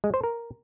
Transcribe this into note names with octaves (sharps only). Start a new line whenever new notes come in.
G#3
C5
A#4